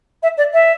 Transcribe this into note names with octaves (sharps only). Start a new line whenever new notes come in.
E5
D5
E5